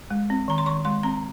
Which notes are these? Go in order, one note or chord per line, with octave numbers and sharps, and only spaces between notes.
G#3
C4
D#3 A#5
C6
D#3 C#6
G#3 C6
C4 A#5